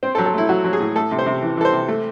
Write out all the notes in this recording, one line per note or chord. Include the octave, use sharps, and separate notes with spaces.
C4 C5
A4
F#3
A4
A3 E4
F#3 F#4
F#3
G#4
A2
A3 A4
C3
C5
C3
E3
E3 A4
C5
C3
A3